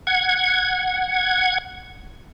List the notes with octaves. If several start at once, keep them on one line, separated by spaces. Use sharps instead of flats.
F#5 G#6